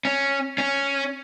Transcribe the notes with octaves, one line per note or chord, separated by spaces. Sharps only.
C#4
C#4